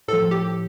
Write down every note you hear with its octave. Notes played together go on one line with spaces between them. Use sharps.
A2 F3 A4
G4